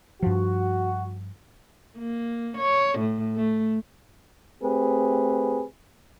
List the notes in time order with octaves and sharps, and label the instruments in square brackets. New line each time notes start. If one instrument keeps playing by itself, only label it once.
[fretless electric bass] G2 F3 [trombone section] F#4
[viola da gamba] A#3
C#5
A2
A3
[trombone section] A3 C4 G4 G#4 B4